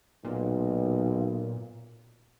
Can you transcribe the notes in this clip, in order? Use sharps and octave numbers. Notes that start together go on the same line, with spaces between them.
B1 A#2